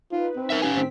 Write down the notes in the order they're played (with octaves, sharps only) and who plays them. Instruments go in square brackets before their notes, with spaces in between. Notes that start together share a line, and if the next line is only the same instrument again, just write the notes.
[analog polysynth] D#4 B4 [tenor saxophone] F4
[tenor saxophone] C4
[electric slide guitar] A#4 E5
C#4 G4 G#5
[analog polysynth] A2 D#3 B6 [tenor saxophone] C4